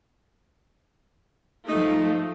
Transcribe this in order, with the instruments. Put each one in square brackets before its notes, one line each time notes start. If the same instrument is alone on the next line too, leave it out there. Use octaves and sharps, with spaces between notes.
[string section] F3 A3 [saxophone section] D#4